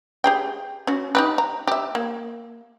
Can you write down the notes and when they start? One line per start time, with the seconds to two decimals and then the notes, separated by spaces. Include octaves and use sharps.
0.24 G4 G#4 G5
0.87 C#4 F#4
1.15 D#4 G4 B4
1.38 A#5
1.67 G4 E5
1.95 A#3